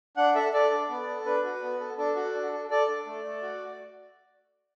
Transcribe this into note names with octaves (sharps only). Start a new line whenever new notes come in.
D4 F#5
A4 E5
A4 D5
D4
B3
A4
D4 B4
F#4
B3
A4
D4 A4
F#4
D4
A4
A4 D5
D4
A3
A3
F#4